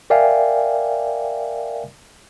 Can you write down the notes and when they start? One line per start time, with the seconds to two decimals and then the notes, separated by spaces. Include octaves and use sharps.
0.10 A#4 D5 E5 F5 G5 G#5